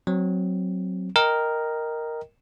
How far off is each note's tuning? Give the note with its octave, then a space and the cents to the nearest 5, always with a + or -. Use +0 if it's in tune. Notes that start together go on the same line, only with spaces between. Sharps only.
F#3 +0 C4 +0
A#4 +0 D#5 +0 G5 +0